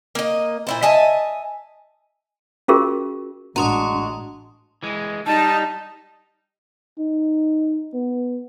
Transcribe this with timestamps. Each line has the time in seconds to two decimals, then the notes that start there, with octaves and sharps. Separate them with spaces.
0.15 A#3 D#5
0.67 A#2 E4 C5
0.83 D#5 E5 G#5 A5
2.68 C#4 F4 F#4 G#4 A#4 C#6
3.56 A1 G#3 D4 F#4 A#5 C6 D#6
4.83 E3 G#3
5.26 G3 D#4 A5
6.99 D#4
7.94 B3